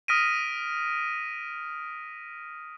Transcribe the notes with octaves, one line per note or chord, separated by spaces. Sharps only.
D#6 F6 A#6 B6 D7 D#7